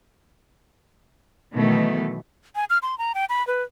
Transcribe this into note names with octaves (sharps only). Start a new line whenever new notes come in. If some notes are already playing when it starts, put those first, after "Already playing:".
B2 D#3 E3 F#3 A3
G#5
F6
C6
A#5
G5
B5
B4